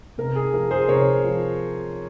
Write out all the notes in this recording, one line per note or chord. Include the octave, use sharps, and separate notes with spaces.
C3 A#4
G#4
F3 A#4
G#4 C5
C3 A#4 C#5
F3